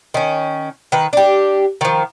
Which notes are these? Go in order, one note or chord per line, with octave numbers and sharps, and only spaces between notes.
D#3 C#4
D#3 B4
D4 G4
D#3 F3